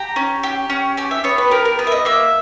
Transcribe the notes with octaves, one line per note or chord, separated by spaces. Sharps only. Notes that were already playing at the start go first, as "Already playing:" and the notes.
Already playing: G4 A#5
C#4
G4
C#4
G4 G#5
E5
B3 C#5
B4
G4 A#4
A#4
B3 B4
E5
D#5
A#3 E5